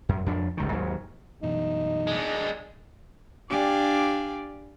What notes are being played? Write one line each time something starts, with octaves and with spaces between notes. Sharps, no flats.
F#2
F2 D4
G1 C#2 D#3
D#2 G#2 F#3
F#2 B2 E3 D#4
G#3 D4
D4 G4 D5 F5 G#5